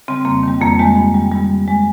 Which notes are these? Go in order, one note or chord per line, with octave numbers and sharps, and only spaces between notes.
C#3 G3 C4
F2 A#3
D#3 G3
F2 A#3
D#3 G3 G#3
G2
G3
G2 G3
G3
G#3